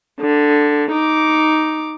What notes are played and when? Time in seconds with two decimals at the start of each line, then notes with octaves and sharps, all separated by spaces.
0.20 D3
0.92 D#4 D6